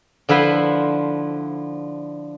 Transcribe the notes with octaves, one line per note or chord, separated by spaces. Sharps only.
D3 F3 E4 B4 C5